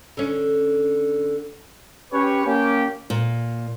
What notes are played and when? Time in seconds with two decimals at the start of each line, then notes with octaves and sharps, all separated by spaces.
0.17 D3 C#4
2.13 C#4 G4 B4 C#5
2.45 A#3 C#4 G4
3.10 A#2